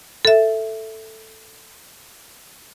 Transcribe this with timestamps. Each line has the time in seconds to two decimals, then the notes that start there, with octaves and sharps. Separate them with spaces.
0.25 A4 E5